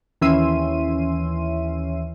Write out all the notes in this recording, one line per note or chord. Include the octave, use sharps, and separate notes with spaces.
D#2 E3 C#4 E5 C6 D#7